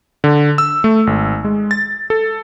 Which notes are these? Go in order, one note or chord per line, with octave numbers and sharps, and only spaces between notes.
D3
E6
A3
G#1
G#3
A6
A4